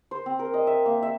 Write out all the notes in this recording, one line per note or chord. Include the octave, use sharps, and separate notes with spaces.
C5
C4
A#4
D#5
E5
A#3
E5